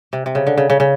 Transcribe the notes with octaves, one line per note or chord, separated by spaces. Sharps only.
C3
C3
C#3
D3
C#3
C#3
C#3